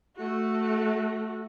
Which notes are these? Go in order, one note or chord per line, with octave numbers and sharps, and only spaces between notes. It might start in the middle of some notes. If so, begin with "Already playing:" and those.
A3 F#4